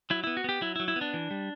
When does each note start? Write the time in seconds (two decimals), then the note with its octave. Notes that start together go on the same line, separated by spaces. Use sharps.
0.10 F#3 E4
0.24 B3 E4
0.37 F#4
0.44 B3 G4
0.61 F#3 E4
0.76 E4
0.80 F#3
0.88 E4
0.96 B3
1.01 D4
1.14 E3
1.31 G3